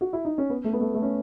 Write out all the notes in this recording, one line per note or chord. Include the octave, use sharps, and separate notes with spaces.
F#4
E4
D#4
C#4
B3
A3
B3
A3
A3
C#4